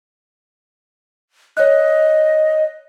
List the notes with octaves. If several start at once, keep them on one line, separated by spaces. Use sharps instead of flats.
C#5 D#5 F#6